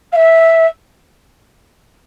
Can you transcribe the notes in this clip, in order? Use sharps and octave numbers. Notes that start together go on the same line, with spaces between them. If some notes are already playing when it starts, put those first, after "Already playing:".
F5
E5